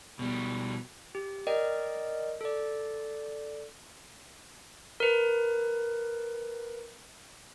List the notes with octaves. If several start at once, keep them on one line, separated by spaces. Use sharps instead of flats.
B2 G3
G4
A#4 D5 D#5 G5
A4 D5
A#4 B4